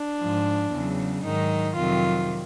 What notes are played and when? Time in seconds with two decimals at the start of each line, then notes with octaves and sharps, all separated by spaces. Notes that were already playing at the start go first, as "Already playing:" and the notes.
Already playing: D4
0.19 G#2 F3
0.71 E2 C#3 F#3
1.23 G#2 D#3 F#3 D#4
1.76 F2 C3 D#3 F#3 F4